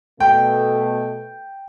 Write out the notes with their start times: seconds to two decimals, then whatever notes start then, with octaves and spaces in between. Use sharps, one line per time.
0.20 B2 A3 G5